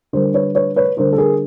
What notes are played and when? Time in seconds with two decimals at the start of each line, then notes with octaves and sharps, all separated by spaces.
0.13 D3 G3 A#4 C5
0.34 B4 C#5
0.55 B4 C#5
0.76 B4 C#5
0.97 D3 G3 A#4 C5
1.13 A4
1.18 G#4 A#4